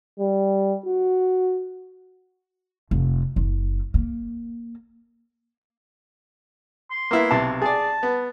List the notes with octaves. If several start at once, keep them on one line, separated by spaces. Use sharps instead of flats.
G3
F#4
F1
F#1
A#3
C6
A#3 B3 E4
B1 C3 A5
G#4 D5 A5
B3